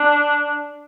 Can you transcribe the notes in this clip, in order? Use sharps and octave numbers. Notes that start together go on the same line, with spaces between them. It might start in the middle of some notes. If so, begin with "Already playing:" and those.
Already playing: D4